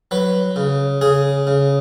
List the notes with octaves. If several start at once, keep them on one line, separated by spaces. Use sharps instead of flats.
F#3 B4
C#3
C#3 G#4
C#3